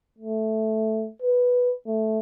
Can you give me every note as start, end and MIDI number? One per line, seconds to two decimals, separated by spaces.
0.18 1.08 57
1.22 1.73 71
1.87 2.20 57